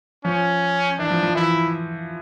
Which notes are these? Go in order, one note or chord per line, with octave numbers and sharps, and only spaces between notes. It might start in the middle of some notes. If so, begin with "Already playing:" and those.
F3 C#4
E3 D4
F3
F3
E3 E4